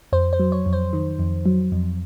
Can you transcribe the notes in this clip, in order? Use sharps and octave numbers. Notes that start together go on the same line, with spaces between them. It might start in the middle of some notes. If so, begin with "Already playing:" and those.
F2 C5
C5
F#3
C#5
F2
C5
D#3
F2
F#3
F2